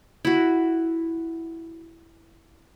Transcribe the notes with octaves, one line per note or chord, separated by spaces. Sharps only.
E4 F#4